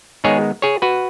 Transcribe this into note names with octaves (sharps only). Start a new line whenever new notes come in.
D#3 G#3 B3 D#4 G#4 C#5
G#4 C#5
F#4 B4